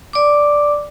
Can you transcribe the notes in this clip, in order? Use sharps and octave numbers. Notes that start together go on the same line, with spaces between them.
D5 D6